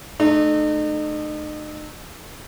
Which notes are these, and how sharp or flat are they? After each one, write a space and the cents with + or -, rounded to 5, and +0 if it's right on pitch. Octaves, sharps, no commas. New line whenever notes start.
A3 -25 D#4 -40